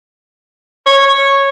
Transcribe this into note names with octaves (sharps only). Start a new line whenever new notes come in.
C#5